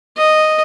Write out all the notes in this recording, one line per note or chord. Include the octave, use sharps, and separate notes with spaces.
D#5